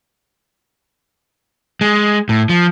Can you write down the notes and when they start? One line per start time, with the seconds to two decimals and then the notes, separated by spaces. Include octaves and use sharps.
1.81 G#3
2.29 A2
2.49 F3